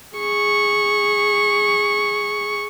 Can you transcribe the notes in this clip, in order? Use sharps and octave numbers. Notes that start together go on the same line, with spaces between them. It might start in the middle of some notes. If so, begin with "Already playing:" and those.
G#4 C#6